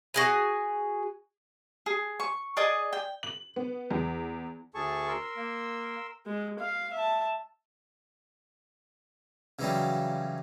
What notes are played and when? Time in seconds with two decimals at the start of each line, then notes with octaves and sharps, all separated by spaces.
0.14 F#4 G#4 G#5
1.86 G#4
2.20 C#6
2.57 G#4 D5 D#5 D#6
2.93 G5
3.23 F#7
3.56 B3
3.91 E2
4.75 D2 G#4 A4 A5 C#6
5.08 A#4 C6 E6
5.37 A#3
6.26 G#3
6.59 F5
6.93 E5 A5
9.59 C#3 E3 F#3 G3